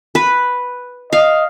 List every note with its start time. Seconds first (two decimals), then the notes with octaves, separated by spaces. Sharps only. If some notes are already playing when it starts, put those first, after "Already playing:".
0.15 B4
1.13 D#5 F5